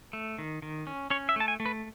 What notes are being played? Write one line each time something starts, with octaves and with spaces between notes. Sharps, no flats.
A3
D#3
D#3
C#4
C#4 C#5
E5
A3 A5
G#5
A3
B4